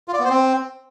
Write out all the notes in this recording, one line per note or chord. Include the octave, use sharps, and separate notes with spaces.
F4
D5
B3
C5
C4